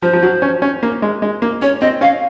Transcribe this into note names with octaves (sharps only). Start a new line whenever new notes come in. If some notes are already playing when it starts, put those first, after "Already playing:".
F3 C5
F3
F#3
C#4
C#4
A#3
G#3
G#3
A#3
C#4 C#5
C4 D#5
C#4 F5